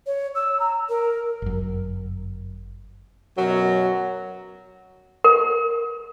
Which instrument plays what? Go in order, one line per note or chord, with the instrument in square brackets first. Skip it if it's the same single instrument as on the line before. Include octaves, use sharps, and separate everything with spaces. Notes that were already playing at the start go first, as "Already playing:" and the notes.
[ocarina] C#5
E6
A#5
A#4
[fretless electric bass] G1 F#2
[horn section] F#2 B2 F#3
[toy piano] A#4